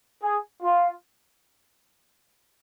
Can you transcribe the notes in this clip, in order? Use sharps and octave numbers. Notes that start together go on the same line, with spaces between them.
G#4
F4